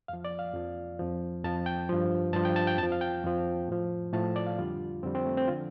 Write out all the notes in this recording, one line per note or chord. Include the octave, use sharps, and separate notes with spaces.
F2 F3 F5
D5
F5
F2 F3
F2 F3
F2 F3 A5
G5
G2 F3
G2 F3 A5
G5
A5
G5
F2 A5
F3
F5
G5
F2 F3
A2 F3
A2 F3 A5
D5
F5
F2 D3 G3 F4
F2 D3 G3 C4
C4
A3
C4
D3 F3 F4